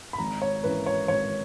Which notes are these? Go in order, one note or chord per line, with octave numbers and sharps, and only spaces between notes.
B5
G#1 A#5
C#5
G#2 E3 A#3 C#4 B4
C#5
G#1 C#5